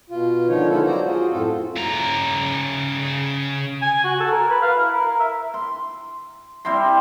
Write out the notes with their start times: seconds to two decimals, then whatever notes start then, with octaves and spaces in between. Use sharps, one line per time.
0.10 B2 F4
0.48 D3 D#3 F3 D#4 C#5
0.70 G#3 B3 C#4 E4 F4 A4
0.86 F#3 F#4 C5 D5 A#5
1.06 F4 F#4 G#4
1.30 F#2 A2 C4 F4 A4
1.77 C#3 A#5
3.82 G#5
4.04 F#4
4.20 A4
4.32 A#4
4.50 B4
4.62 F5
4.76 E4
4.92 A#4
5.07 A#4
5.20 E5
5.54 C6
6.65 G3 C4 E4 C6